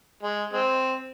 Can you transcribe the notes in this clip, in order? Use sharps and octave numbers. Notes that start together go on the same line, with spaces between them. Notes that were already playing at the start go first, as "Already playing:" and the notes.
G#3
G#3 C4